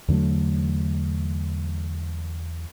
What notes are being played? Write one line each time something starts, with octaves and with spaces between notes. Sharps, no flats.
E2 D3 F#3 A3